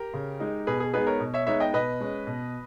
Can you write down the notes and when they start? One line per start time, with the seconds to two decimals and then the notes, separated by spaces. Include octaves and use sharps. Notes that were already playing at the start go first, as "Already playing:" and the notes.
Already playing: G4 A#4
0.14 C#3
0.40 G#3 D#4
0.67 B2 G#4 B4
0.80 G#4
0.94 G#3 B3 D#4 G#4 B4
1.07 A#4 C#5
1.20 B2
1.34 C#5 E5
1.46 G#3 B3 D#4 C#5 E5
1.60 D#5 G5
1.73 B2 B4 D#5
2.00 G#3 C#4
2.27 B2